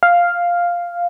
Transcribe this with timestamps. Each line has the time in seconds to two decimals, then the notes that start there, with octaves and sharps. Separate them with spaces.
0.03 F5